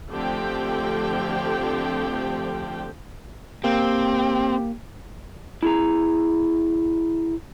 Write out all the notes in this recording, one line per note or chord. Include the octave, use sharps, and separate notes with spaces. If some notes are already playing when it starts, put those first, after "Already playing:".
D3 F3 A3 C4 G4 G5
A#3 C4 G4
E4 G#4 A#5